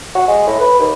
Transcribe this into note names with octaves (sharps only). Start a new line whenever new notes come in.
F#4
G#3
A2
B4
D#2